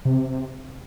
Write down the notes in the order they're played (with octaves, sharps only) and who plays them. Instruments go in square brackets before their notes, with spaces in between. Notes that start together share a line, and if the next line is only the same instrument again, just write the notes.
[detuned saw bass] C3